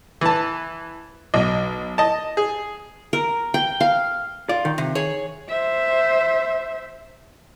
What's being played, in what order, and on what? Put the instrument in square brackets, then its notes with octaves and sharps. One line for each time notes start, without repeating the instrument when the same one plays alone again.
[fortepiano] E3 A5
B1
D#5 A5
G#4
[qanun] A#4
G5
F5
[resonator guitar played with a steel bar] F4 [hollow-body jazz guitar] D5
[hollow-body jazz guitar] D#3
[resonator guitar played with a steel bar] C3
G#4 C#5
[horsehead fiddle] C5 E5